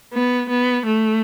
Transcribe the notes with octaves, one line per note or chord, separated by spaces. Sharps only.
B3
B3
A3